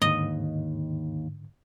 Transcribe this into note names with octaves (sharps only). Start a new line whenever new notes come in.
D#2 G#2 D3 D#5